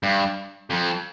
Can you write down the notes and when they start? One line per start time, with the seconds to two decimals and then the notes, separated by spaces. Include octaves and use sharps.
0.03 G2
0.70 F2